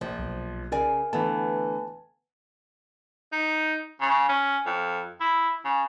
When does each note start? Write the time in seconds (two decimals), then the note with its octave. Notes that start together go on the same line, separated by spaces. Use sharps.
0.01 A#1 F3
0.19 B1
0.72 C#3 A#4 D5 G#5
1.13 D3 E3 A3 B3 A5
3.32 D#4
4.01 C#3
4.29 C#4
4.66 F2
5.20 E4
5.65 C#3